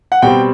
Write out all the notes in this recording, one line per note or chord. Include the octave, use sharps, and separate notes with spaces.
F#5
B2 G3 C4 G5